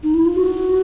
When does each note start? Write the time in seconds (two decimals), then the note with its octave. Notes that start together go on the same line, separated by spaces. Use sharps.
0.03 D#4
0.14 E4
0.26 F4
0.36 F#4